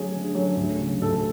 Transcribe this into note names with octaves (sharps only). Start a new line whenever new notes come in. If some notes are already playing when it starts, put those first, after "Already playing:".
Already playing: D3 F#3 A3 C#4 G#4
D3
F#3 A3 C#4
D2
C#3
F#3
D2 A4